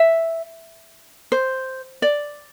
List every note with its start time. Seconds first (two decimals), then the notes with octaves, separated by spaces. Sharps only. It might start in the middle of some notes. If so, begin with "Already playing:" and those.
Already playing: E5
1.32 C5
2.02 D5